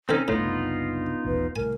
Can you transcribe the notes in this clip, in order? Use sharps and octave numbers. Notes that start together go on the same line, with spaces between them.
D3 D#3 C4 C#4 D#4 A4
F#1 C2 A2 B3 D4 D#4 F4
D#1 A1 B4
C2 A2 A#4 G#5